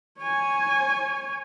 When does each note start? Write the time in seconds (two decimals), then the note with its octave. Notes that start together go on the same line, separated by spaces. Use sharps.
0.20 C#5 G#5